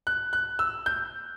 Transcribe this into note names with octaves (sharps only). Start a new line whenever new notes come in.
F#6
F#6
E6
G6